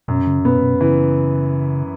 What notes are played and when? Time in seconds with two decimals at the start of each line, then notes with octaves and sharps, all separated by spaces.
0.08 F#2 B2
0.27 C#3
0.45 B2 B3
0.62 B2
0.81 C#3 E3